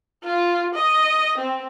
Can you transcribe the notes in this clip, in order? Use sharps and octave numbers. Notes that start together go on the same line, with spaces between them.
F4
D#5
C4